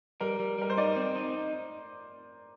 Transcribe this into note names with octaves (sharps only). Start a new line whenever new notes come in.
G3 A#4
G3
G3 A#4
C5
D#4 D5
C4
D#4